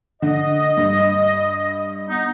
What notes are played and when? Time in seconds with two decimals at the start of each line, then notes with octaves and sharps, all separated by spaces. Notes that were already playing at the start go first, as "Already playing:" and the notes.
0.22 D3 D#5
0.77 G2
2.08 B3 D#4